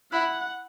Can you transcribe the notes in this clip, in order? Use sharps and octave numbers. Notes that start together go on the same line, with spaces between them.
E4 F#5